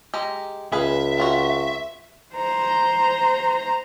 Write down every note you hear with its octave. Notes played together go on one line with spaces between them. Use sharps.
G#3 G4 A#5
C#2 G#4 B4 E5 F5
C4 F4 F#4
C5 A#5